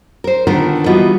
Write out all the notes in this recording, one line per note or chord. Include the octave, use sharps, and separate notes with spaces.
A#4 C5
D3 D#3 A3 B3 F4 A#4
E3 G3 B3 F4 F#4 D#5